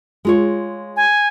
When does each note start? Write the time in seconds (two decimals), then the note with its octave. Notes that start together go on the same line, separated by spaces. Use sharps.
0.25 G#3 F4 C#5
0.96 G#5